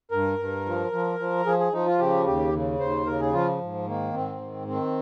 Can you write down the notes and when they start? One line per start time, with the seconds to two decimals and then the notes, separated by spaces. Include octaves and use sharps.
0.11 G2 A#4
0.39 G2
0.66 F3
0.92 F3
1.19 F3
1.46 F3 G#4
1.59 G#4
1.72 F3 D#4
1.86 F4
1.99 C#3 G4
2.26 D#2 G4
2.53 C#3
2.80 D#2 C5
3.07 C#3 A#4
3.20 G#4
3.33 F3 F4
3.61 G#2
3.87 D#3 A#3
4.13 G#2 C4
4.41 D#3
4.67 D#3 C4